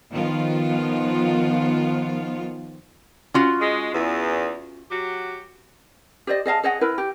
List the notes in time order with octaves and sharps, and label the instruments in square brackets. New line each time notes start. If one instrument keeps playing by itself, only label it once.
[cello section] D#3 F3 B3 F4
[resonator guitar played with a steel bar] C#4 F4 F#4
[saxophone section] G#3
E2
F#3 F#4 G4
[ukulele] G4 C5 D5 D#5
G#4 D#5 F5 A5
G#4 C#5 D#5 F#5
E4 A#4 B4
G4